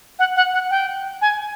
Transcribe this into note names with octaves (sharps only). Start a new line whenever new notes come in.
F#5
F#5
F#5
G5
G#5